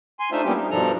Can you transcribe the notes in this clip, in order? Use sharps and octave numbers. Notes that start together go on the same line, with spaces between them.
G#5 C6
A3 D4 D#4 F4 C5 E5
G3 A#3 B3 C#4 G4
D#4
G2 B2 F3 D4 A4 A#5